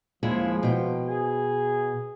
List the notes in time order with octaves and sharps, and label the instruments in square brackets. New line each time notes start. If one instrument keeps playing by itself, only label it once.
[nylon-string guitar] D#2 G#3 E4 [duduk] F3
[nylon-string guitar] B2 G5
[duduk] G#4